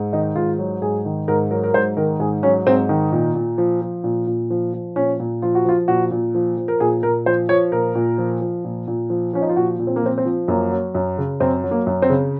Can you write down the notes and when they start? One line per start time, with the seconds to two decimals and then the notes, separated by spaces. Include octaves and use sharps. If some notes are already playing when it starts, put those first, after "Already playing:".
Already playing: G#2
0.13 D#3 D#4
0.35 G#2 F4
0.59 F#3
0.82 G#2 G#4
1.05 D#3
1.28 G#2 A#4
1.51 F#3 A#4
1.64 A#4
1.74 G#2 C5
1.97 D#3 A#4
2.20 G#2 G#4
2.43 F#3 C#4
2.66 G#2 C4
2.89 D#3
3.12 A#2
3.35 A#2
3.58 F3
3.82 F3
4.04 A#2
4.27 A#2
4.50 F3
4.73 F3
4.96 A#2 C#4
5.20 A#2
5.42 F3 F4
5.55 F#4
5.65 F3 F4
5.88 A#2 F#4
6.11 A#2
6.35 F3
6.57 F3
6.68 A#4
6.80 A#2 G#4
7.03 A#2 A#4
7.26 F3 C5
7.49 F3 C#5
7.72 A#2 A#4
7.95 A#2
8.18 F3
8.41 F3
8.65 A#2
8.88 A#2
9.10 F3
9.33 F3 C#4
9.42 D#4
9.49 F4
9.56 A#2 F#4
9.79 A#2
9.87 C4
9.96 A#3
10.02 F3 C4
10.18 C4
10.25 F3
10.48 F#2 A#3
10.72 F#3
10.95 F#2
11.18 C#3
11.40 F#2 C4
11.64 F#3
11.71 A#3
11.87 F#2
12.02 C4
12.10 C#3